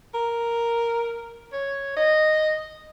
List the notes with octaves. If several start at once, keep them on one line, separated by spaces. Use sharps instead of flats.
A#4
C#5
D#5